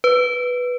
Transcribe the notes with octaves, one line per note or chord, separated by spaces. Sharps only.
B4